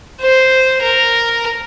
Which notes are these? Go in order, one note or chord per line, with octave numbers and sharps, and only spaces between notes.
C5
A#4